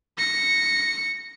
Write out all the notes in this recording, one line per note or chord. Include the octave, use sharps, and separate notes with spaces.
A#6 C#7